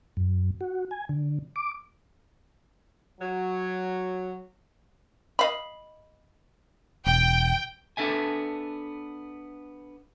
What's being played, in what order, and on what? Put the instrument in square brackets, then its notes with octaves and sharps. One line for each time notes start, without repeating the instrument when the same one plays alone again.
[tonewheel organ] F#2
F#4
G#5
D3
D6
[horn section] F#3
[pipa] D#5 F5 B5
[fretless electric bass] E1 [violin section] G5
[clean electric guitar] B3 D4 A4 E5 G#5